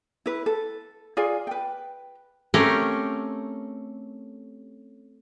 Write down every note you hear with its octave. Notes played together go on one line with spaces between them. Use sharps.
E4 B4
A4
F4 G#4 D5 G#5
B4 G5
A3 C4 C#4 G4 A4 A#4